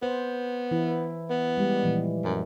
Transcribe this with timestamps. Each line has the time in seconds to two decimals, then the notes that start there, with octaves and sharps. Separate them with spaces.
0.03 B3 C5
0.71 E3 E4
1.30 B3
1.57 G3 G#3 G4
1.83 A#2 E3 F3
2.25 F#2